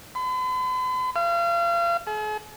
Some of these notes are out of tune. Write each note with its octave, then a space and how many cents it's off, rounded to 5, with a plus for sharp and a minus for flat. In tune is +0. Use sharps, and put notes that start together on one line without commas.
B5 +45
F5 -35
G#4 +45